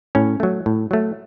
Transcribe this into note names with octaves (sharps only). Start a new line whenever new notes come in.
A2 C#4
F#3 A3
A2
F#3 A3